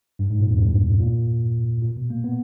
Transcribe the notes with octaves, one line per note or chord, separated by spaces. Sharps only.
G2
G#2
A#2
E2
G2
A#2
A#2
B2
A#3
B3